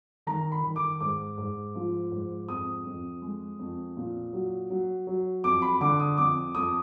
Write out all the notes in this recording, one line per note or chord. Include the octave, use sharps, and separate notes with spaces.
D#3 A#5
B5
D#3
D6
G#2 D6
G#2
F3
G#2
F2 D#6
F2
G#3
F2
A#2
F#3
F#3
F#3
F2 D6
B5
D3 D6
D#6
F2 D6
F2 D#6